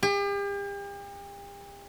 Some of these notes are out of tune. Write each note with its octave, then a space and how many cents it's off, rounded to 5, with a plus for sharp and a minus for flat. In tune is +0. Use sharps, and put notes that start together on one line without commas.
G4 +40